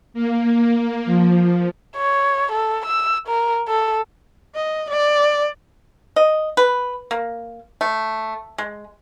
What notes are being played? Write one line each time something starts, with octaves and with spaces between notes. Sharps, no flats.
A#3
F3
C#5
A4
E6
A#4
A4
D#5
D5
D#5
B4
A#3
A3
G#3